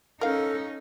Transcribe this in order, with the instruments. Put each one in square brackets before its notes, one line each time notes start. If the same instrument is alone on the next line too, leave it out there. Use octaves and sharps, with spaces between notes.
[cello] C#4 D#4 [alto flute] A4 [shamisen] A#4 F5